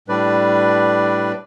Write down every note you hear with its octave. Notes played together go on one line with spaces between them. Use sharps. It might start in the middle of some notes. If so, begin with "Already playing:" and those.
A2 G3 D4 B4 D5